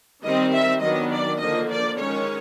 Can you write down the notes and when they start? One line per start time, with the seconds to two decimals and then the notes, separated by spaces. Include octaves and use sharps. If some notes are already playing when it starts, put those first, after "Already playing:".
0.23 D#3 G3 C4 D#5
0.52 E5
0.81 D#3 F#3 B3 D4 D#5
1.11 D5
1.39 D3 F3 A#3 D#5
1.69 D5
1.97 D#3 G#3 C#4 C#5